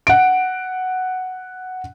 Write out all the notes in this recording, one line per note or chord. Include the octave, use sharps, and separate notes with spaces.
F#5 D7